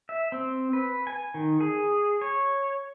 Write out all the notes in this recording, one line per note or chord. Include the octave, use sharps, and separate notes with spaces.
E5
C4
B4
G#5
D#3
G#4
C#5